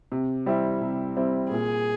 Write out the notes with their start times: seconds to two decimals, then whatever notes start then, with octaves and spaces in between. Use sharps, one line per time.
0.12 C3
0.46 G3 C4 E4
0.82 C3
1.16 G3 C4 E4
1.50 A#2 G#4